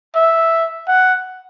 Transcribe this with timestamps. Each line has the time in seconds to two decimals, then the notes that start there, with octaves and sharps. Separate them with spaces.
0.15 E5
0.88 F#5